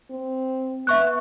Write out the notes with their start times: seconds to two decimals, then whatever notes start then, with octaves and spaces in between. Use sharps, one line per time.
0.10 C4
0.87 B3 E5 C#6 F#6